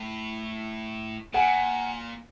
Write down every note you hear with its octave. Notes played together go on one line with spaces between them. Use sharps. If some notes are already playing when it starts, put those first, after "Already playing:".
Already playing: A2
A#2 F#5 G#5